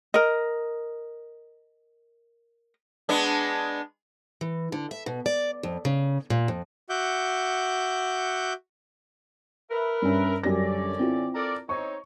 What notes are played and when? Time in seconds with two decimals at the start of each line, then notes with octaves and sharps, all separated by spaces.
0.14 A#4 D#5
3.09 G#3 B3 D4
4.41 E3
4.72 D3
4.91 E5
5.06 B2
5.26 D5
5.63 F2
5.85 C#3
6.30 A#2
6.48 F2
6.89 F#4 E5 F#5 D6 G6
9.71 A#4 B4 E5
10.02 G2 C#4
10.43 F#2 D3 G3 C#4 D5 A#6
10.99 C4 E4 F4
11.35 A4 A#4 D5
11.69 C4 D#4 C#5 C#6